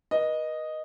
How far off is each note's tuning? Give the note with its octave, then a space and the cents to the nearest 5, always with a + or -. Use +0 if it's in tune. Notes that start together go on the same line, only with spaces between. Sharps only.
B4 -40 D#5 -5